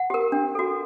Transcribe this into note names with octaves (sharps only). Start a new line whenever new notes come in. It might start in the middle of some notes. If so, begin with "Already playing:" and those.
Already playing: F#5
G4 A#4
D4
F#4 A4